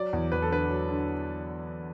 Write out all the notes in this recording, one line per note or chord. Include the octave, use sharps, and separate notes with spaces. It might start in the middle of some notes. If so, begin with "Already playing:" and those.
Already playing: F#3 D5
E2
E2 B4
A4
D3 B4
F#3
D3